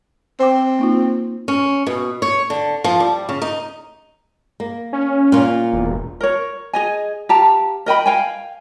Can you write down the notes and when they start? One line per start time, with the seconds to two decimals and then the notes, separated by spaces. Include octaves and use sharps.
0.40 C4 C5 G5 D6
0.79 A#3 D#4 F4
1.48 C#4
1.87 B2
2.22 C#5
2.50 D3
2.84 F3
3.00 G3
3.29 C#3
3.42 D#4
4.60 A#3
4.93 C#4
5.32 A#2 F4
5.73 E1
6.21 A#4 C#5
6.73 G#4 D#5 G#5
7.29 G4 F5 A5 A#5
7.86 A#4 D#5 G5 B5
8.06 F5 G5 G#5